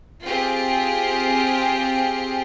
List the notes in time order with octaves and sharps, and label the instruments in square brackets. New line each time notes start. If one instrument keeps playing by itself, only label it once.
[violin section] C4 F4 G4 G#4